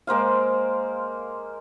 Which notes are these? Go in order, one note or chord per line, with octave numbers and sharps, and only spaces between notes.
G#3 A#3 C5 F5